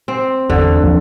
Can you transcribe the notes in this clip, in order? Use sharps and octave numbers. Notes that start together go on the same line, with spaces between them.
C4
G1 E2 D3
D#2 F3 A#3